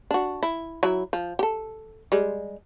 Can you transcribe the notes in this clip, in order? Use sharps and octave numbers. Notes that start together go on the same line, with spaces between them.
D4 F#4
E4
F#3 E4
F3
G4 A4
G3 G#3